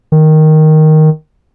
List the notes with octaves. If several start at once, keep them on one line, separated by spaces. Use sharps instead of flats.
D#3